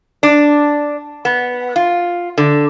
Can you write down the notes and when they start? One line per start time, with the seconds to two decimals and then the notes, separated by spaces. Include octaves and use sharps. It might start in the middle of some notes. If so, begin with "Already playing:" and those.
0.23 D4
1.25 B3
1.76 F4
2.38 D3